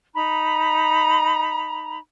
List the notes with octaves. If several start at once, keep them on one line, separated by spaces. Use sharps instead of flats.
D#4 A#5 B5